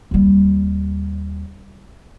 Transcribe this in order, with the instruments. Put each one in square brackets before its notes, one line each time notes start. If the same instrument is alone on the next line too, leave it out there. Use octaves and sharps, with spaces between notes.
[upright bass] D#2 G3